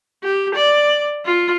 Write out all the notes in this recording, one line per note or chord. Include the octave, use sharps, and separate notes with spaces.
G4
D5
F4